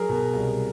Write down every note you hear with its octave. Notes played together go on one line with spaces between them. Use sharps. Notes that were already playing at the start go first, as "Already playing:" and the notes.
Already playing: F#3 G#4 A#4
B2
C2